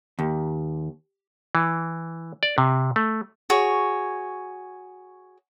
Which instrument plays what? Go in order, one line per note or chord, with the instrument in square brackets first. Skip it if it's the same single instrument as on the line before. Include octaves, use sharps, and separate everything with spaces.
[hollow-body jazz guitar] D#2
[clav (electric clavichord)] E3
D5
C3
A3
[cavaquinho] F#4 G#4 C#5